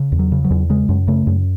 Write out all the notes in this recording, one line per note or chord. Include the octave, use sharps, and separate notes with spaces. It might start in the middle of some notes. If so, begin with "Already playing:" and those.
Already playing: C#3
E2
F#3
C#3
F#3
E2
C#3 G#3
F#2
C#3 A3
F#2